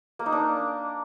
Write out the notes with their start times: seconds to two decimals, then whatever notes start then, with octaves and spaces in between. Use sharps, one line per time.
0.19 A#3
0.26 D#4
0.32 D4